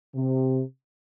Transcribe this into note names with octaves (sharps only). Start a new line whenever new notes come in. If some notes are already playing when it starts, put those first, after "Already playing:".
C3